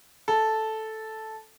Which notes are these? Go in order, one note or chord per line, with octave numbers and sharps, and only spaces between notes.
A4